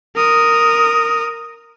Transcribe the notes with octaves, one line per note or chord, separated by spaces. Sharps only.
A#4 D#6